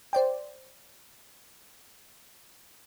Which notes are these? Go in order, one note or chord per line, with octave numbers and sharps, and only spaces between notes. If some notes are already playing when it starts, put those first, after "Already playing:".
C5 D5 G5